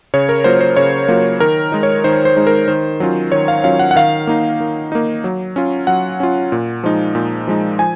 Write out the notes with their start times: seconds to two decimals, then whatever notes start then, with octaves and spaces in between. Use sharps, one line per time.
0.14 C#3 C#5
0.29 A#4
0.44 F#3 A#3 F4 C5
0.61 C5
0.77 C#3 C#5
1.08 F#3 A#3 F4
1.40 D#3 A#4
1.72 G#3 D#4
1.83 C#5
2.04 D#3 C5
2.25 C5
2.37 G#3 D#4
2.47 A#4
2.68 D#3 C5
3.00 F#3 C#4 F4
3.32 D#3 C#5
3.48 F5
3.64 F#3 C#4 F4 F5
3.80 F#5
3.91 F#5
3.96 D#3 F5
4.27 A#3 D#4
4.60 D#3
4.92 A#3 D#4
5.24 F#3
5.56 C#4 F4
5.87 F#3 F#5
6.20 C#4 F4
6.52 A#2
6.84 F3 G#3 D#4
7.15 A#2
7.47 F3 G#3 D#4
7.79 F3 G#5